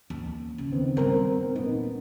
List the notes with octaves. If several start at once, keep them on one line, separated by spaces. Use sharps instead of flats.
D#2
C#3
D#3 B3 C4
G2 G3 B3 C4 A#4
D#1 B3 D#4